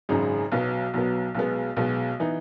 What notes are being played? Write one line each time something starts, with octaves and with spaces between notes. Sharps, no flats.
G#1 F#2 C#3 G#3 D#4
B1 B2 F#3 B3
B1 B2 F#3 B3
B1 B2 G#3 B3
B1 B2 G#3 B3
E3 B3 D#4